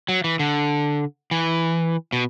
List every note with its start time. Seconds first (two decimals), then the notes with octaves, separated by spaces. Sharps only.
0.09 F#3
0.24 E3
0.39 D3
1.31 E3
2.12 B2